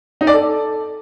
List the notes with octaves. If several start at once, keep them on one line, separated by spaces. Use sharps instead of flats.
D#4
D5
A4